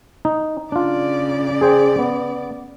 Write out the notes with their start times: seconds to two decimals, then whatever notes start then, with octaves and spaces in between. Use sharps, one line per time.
0.25 D#4
0.72 C#3 D4 F4 D5
1.61 G#4 C5 G5
1.99 B3